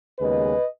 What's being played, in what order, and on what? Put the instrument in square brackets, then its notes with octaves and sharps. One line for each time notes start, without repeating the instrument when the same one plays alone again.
[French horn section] D#2 C#3 G#3 B3 B4 D#5